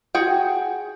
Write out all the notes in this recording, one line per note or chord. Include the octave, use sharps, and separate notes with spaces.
F#4 G#4 G5